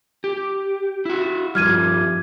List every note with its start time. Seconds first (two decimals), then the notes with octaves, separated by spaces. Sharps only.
0.24 G4
1.05 E4 F#4
1.55 G2 F3 G3 F6 G#6 D#7